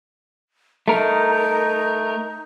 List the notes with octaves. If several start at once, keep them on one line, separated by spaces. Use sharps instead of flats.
A3 D#4 A#4